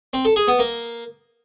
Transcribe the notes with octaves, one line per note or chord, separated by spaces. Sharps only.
C4
A4
G#4
B3
A#3